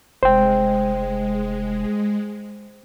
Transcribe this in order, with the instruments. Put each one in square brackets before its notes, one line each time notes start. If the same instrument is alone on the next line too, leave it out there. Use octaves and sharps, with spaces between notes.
[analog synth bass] F1 [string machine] G#3 [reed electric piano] C5 G5